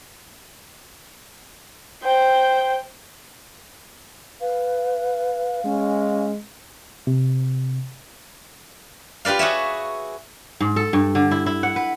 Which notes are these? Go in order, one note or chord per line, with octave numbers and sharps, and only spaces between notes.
C5 G5
B4 F5
G#3 C#4
C3
F4 G4 B4 D5 F5
F#4 G#4 C#5 E5
G#2
A4
G2
D3
E4
E4
F#5
B4